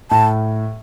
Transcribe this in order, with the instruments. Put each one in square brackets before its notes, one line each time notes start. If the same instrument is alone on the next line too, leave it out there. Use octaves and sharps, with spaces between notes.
[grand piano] A2 [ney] A5